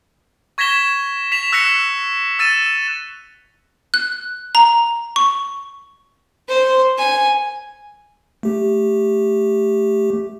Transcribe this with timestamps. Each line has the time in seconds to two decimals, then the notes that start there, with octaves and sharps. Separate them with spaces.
0.58 C#6 G#6 A#6 B6 E7 G7
1.32 B6 E7 F7
1.52 E6 F#6 A#6 B6 C#7 E7
2.39 E6 A6 D#7 E7
3.94 F#6
4.55 A#5
5.16 C#6
6.49 C5
6.98 G#5
8.43 A3 G4